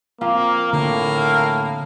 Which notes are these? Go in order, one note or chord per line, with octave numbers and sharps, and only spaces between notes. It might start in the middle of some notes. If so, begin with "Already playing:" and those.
F3 A#3 C4 F4
A2 D3 A#3